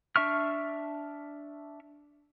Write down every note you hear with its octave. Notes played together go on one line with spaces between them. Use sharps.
D4 E5 C#6 F6